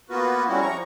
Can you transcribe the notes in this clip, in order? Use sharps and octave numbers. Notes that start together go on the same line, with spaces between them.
A#3 B3 F4 F#4 B4
G3 G#3 C4 C#4 E4 F#4
F3 A#5 C#6